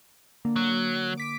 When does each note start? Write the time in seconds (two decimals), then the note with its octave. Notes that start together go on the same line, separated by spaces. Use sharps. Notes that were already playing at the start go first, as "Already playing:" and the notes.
0.45 D3 A#3
0.56 F#3
1.17 D6 B6 D7